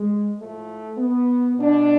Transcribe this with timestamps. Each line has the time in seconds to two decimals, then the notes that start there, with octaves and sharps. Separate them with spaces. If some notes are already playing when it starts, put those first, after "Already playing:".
Already playing: G#3
0.37 A2 F3 A3
0.98 B3
1.57 B2 D4